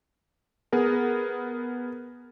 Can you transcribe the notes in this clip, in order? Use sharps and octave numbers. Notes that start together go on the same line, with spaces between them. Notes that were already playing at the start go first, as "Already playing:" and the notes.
B3 G#4 A#4